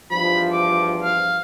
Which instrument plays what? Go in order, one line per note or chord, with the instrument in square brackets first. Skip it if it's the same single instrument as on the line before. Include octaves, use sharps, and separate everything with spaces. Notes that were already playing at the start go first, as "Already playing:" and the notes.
[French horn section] E2 G2 F3 [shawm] B5
[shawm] D6
F5